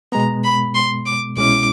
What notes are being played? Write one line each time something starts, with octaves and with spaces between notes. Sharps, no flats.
B2 G#3 B3 A#5
B5
C6
D6
C2 B2 G#3 C#4 E4 D6